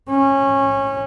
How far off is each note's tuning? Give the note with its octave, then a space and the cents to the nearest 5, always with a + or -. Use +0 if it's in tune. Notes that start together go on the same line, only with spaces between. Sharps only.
C#4 -20